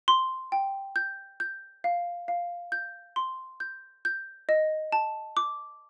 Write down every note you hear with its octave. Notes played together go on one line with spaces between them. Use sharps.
C6
G5
G6
G6
F5
F5
G6
C6
G6
G6
D#5
A5
D6